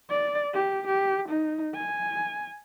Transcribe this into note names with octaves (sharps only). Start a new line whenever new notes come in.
D5
G4
G4
D#4
G#5